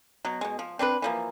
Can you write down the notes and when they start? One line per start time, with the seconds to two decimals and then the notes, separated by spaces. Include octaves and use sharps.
0.25 B2 F#3
0.41 B2 G#3
0.59 F3
0.79 C4 D4 G4 B4
1.02 E3 F3 A#3